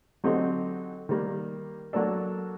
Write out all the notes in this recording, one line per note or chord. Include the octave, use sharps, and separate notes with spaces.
D3 F#3 C4 D#4 G4
D#3 G3 A#3
F#3 A#3 D4 A4